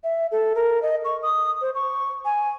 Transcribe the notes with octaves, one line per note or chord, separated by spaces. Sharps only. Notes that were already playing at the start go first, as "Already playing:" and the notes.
E5
A4
A#4
D#5
C#6
D#6
C5
C#6
G#5